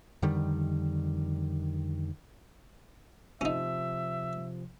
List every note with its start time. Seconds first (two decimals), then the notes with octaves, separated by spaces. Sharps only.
0.22 F2 D3 D#3 G3
3.41 C3 F3 C#4 D#4 E5